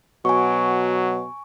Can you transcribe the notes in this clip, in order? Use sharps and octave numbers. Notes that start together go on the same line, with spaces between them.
B2 F#3 G#5 C#6